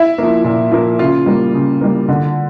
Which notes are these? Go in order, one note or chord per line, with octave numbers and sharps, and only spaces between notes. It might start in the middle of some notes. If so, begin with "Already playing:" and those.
Already playing: E4
F3 A#3
A#2
F3 A#3
C#3 F4
G3 A#3
C#3
G3 A#3
D3